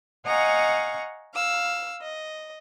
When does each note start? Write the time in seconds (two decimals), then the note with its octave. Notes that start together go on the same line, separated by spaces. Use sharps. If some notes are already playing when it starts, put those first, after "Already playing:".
0.25 D#5 F5 F#5 G#5 A#5 C#6
1.34 F5 E6
2.01 D#5